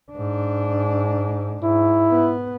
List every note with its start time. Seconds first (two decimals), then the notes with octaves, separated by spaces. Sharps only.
0.12 G#2 D4
1.63 G#2 E4
2.11 B3